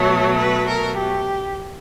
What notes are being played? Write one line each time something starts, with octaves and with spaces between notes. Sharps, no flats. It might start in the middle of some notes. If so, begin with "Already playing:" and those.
Already playing: B2 F#3 A3 C#5
B4
A#4
G4